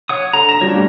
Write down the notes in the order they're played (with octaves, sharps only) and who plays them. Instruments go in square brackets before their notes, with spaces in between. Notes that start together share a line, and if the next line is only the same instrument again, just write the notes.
[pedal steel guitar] C#5 F#5 D#6
[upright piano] D3 [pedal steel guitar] A#5
[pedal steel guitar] A#5 [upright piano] A#6 E7
[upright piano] F3 G3 D4 [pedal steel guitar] C#4 G4 C#5
[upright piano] C2 A2 G3